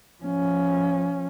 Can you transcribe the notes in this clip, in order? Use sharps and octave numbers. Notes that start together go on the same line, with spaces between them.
F3 C#4